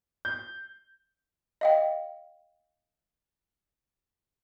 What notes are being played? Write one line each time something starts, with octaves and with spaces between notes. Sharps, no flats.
G6
D#5 F5 G5